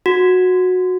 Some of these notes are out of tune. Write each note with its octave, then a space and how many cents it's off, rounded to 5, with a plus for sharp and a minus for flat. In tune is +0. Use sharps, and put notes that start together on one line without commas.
F#4 -15